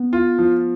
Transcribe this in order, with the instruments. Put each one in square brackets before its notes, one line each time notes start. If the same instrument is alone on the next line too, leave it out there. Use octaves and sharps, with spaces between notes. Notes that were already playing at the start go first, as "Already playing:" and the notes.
Already playing: [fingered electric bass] B3
[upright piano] F4
F3